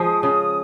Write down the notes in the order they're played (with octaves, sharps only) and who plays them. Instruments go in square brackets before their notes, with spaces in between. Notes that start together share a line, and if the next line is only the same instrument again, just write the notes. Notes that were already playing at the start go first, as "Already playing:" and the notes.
Already playing: [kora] F3 G#3 [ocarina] D#6
[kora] C#3